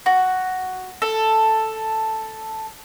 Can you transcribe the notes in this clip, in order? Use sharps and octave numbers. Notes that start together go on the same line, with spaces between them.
F#4
A4